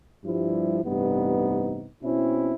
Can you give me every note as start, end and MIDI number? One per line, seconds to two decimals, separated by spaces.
0.25 0.79 43
0.25 0.79 53
0.25 0.79 55
0.25 0.79 64
0.84 1.88 33
0.84 1.88 43
0.84 1.88 48
0.84 1.88 59
0.84 1.88 63
2.03 2.55 47
2.03 2.55 60
2.03 2.55 61
2.03 2.55 64